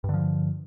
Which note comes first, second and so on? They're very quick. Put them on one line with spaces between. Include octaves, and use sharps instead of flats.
G2 D3 F3